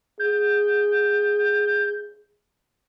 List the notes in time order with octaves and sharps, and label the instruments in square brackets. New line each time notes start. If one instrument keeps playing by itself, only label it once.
[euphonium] G#4 [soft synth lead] G6